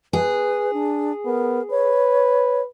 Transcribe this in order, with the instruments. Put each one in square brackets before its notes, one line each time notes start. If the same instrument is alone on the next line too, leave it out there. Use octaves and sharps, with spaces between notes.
[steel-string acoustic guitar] G#4 [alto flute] B4
[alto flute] D4
[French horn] B3 [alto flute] A#4
[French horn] B4 [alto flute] C#5